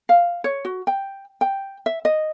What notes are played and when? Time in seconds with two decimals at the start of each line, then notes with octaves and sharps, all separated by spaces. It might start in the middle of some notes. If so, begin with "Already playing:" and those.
0.09 F5
0.44 C#5
0.65 F#4
0.87 G5
1.41 G5
1.86 E5
2.05 D#5